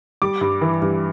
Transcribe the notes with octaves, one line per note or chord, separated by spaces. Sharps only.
G3 D6
G2
E3
G2